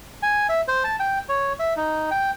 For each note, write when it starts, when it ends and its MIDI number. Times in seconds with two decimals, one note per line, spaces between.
0.23 0.47 80
0.49 0.61 76
0.68 0.83 72
0.84 0.96 81
0.99 1.19 79
1.29 1.53 73
1.59 1.74 76
1.77 2.10 63
2.11 2.31 79